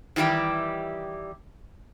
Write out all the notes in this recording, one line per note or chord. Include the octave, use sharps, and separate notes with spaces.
D#3 E3 G3 E4 G4